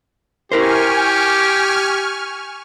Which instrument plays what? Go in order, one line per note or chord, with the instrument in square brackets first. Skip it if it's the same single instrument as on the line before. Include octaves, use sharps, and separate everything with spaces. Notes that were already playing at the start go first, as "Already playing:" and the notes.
[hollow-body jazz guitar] E4 A#4 C5 [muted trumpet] G4 [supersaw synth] G#5 C#6 F6